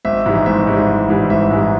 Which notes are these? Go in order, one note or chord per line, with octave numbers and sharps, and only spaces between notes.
G#1 E5
G#2 E3 G3
G#1 E5
G#2 E3 G3
G#1
G#2 E3 G3
G#1 E5
G#2 E3 G3